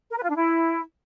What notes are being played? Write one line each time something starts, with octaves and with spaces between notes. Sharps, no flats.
A#4
B4
F4
D4
E4